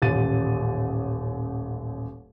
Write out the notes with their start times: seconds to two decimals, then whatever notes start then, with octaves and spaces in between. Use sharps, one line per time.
0.02 D#1 A1 A6 D#7